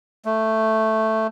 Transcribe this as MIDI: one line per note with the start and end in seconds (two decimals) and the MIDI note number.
0.25 1.27 57